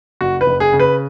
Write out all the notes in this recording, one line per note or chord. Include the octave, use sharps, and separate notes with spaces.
F#1 F#4
B4
F#1
G#4
C#3
B4